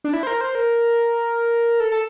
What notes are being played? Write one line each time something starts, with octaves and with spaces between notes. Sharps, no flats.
D4
E4
C5
A#4
C5
A#4
A4
A4